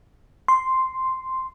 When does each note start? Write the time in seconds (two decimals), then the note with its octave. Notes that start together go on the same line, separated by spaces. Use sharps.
0.48 C6